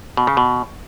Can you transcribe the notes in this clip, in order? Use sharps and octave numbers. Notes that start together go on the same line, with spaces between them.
B2
C#3
B2